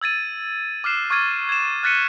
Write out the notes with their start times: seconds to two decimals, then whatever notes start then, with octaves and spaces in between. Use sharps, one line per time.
0.02 E6 G#6 A6 D#7
0.84 D6 F6 F#6 C7 E7
1.10 C#6 D6 F6 G#6 A6 D#7
1.49 G#6 E7
1.83 F6 F#6 A6 B6 C#7 D#7